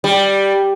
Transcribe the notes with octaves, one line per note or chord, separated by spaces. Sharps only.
G3